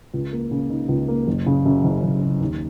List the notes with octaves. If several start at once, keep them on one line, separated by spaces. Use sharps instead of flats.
C#2
A#3
C#3
D#4
C#2
A#3
F#1
C#3
F#2
F#1
F#1
C#3
D#2